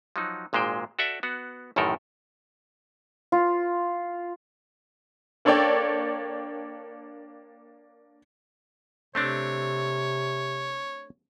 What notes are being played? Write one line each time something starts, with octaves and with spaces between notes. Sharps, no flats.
F3 F#3 D#4 F#4
G#1 A#2 G#3 C5 G5
F#4 A4 D5 E5
B3 F#4
A1 F#2 A2 D#3 A4 A#4
F4
A#3 D4 A4 C#5 D5 G5
C3 A3 C4 D4 C#5